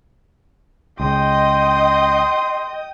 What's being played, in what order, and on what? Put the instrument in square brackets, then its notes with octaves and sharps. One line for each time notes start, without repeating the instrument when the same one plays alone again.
[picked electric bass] C#2 [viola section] D#5 [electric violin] G5 D#6 [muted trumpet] C6